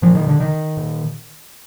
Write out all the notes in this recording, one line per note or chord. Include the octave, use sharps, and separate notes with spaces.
A#2 F3
D#3
D3
D#3
A#2